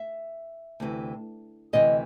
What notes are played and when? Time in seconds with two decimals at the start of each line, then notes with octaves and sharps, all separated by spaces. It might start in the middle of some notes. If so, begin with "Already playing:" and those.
Already playing: E5
0.80 D2 C3 E3
1.73 D2 C3 E3 D#5